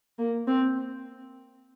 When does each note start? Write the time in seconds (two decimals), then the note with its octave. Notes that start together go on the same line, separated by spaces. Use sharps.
0.18 A#3
0.47 C4